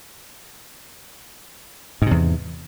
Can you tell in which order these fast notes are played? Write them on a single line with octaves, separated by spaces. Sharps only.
G#2 C3 E2